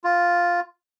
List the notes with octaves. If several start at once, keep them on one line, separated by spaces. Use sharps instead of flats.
F4